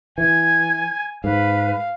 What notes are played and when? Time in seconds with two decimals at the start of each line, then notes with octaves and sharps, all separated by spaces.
0.18 E3 G#5 G#6
1.24 G#2 B4 F5